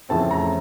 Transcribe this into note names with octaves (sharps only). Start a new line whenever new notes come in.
F2 C#3 E3 A3 C4 A5
A#5